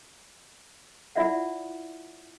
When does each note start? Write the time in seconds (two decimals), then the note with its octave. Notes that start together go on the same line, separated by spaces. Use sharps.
1.16 E4 F4 D5 E5 F#5